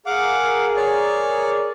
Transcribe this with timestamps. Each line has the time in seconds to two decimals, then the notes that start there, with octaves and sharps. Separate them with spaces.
0.06 G#4 A#4 F5 F#5 D6
0.76 C#5 D5